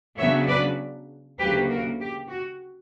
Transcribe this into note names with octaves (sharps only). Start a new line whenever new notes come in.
C#3 F#3 B3 D4 C#5 E5
B4 D5
D2 C#3 F#3 A#3 G4 B4
F#4 A#4
G4
F#4